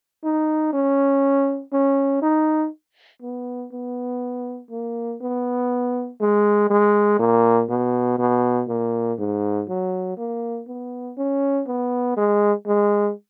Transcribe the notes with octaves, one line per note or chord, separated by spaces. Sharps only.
D#4
C#4
C#4
D#4
B3
B3
A#3
B3
G#3
G#3
A#2
B2
B2
A#2
G#2
F#3
A#3
B3
C#4
B3
G#3
G#3